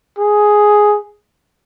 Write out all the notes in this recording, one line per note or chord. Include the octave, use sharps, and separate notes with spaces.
G#4